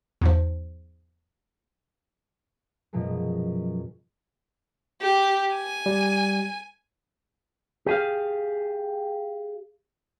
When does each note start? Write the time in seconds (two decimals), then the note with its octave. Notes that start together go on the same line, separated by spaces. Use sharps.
0.21 E2 G#2 F3
2.93 F#2 B2 F3 F#3 G#3
5.02 G4
5.54 G#5
5.86 G3
7.86 G4 G#4 F5